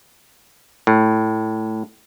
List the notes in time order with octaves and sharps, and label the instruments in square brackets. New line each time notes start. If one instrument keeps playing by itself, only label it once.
[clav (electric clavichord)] A2